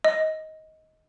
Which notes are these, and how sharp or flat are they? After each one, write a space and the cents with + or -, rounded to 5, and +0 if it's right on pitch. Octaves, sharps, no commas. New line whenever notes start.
D#5 +15